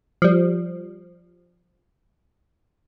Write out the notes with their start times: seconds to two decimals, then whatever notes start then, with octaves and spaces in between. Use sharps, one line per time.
0.22 F3 G3